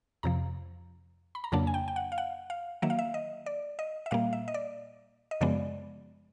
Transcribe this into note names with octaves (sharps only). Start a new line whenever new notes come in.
F2 C3 F3 A#5
B5
A#5
F2 C#3 F#3 A#3 D4 A5
G#5
G5
G5
F#5
F5
F#5
F5
D#3 F#3 A#3 E5
F5
E5
D#5
D5
D#5
E5
A#2 G3 A#3 F5
E5
D#5
D5
D#5
F#2 C#3 F3 G#3 B3 D5